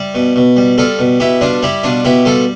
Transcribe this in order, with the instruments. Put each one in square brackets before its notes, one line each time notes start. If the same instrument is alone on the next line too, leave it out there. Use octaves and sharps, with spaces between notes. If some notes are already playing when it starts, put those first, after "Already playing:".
Already playing: [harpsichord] G3 E4
B2
B2
G3
G3 F4 A4
B2
B2 E4 G4
G3 D4 F4
G3 E4 G4
B2 D4 F4
B2 E4 G4
G3 F4 A4